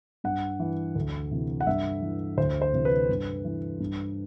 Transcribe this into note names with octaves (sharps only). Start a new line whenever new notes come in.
G2 F#5
E3
D2
C3 E3
F#5
G2 E5
E3
D2 C5
C5
C3 E3
B4
G2
E3
G2